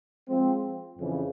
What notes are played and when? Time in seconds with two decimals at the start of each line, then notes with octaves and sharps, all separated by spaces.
0.28 F3 G#3 C4
0.98 F2 C#3 E3